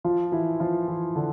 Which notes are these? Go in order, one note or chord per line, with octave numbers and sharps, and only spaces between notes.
F3 F4
E3 E4
F3 F4
E3 E4
D3 D4